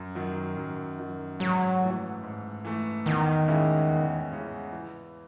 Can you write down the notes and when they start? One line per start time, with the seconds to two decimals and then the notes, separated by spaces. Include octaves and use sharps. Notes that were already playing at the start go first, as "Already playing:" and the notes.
Already playing: F#2
0.15 D#3 F#3
0.57 F#2
0.99 D#3 F#3
1.39 G#2 F#3
1.81 E3 A3
2.23 G#2
2.65 E3 A3
3.06 E2 D#3
3.48 C#3 G#3 C#4 E4
3.89 E2
4.31 C#3 G#3 C#4 E4
4.72 E3